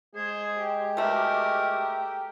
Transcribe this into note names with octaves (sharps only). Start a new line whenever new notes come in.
G#3 G#4 C5
G4
B2 A3 A#4